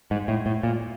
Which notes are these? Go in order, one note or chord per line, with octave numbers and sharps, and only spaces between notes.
G#2
A2
A2
A#2